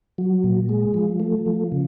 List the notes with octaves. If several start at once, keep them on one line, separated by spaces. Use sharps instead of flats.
F#3
A#2
G#3
F3
A3
F3
C#3